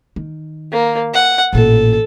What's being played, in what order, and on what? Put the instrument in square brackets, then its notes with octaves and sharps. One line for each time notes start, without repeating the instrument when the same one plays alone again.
[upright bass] D#3
[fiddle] A#3
F#5
[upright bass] A1 A#2 [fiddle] A4